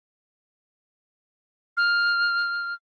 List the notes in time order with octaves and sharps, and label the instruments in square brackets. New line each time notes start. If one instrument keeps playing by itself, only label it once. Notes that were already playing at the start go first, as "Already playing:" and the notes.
[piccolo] F6